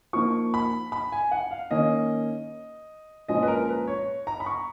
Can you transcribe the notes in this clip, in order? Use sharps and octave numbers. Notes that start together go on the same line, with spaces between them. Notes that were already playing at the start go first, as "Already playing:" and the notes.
F3 A#3 D#4 C#6
B5
B5
G#5
F#5
F5
D#3 A#3 C#4 D#5
A#2 F3 G#3 C#4 D#5
B4
A#4
B4
C#5
A#5
B5
C#6